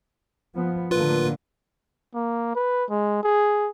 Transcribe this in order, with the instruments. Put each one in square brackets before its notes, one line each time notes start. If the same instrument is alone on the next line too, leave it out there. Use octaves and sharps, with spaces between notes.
[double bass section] F3 B3
[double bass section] A2 D3 A#3 [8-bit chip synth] F4 B4
[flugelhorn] A#3
B4
G#3
G#4